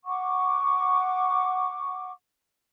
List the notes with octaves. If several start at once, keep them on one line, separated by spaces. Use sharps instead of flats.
F#5 C#6 D6